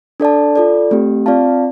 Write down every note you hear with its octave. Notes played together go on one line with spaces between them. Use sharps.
D4 A4 D5 A5
F4 A4 D5
A3 C4 G4
C4 F4 D5 F5 A5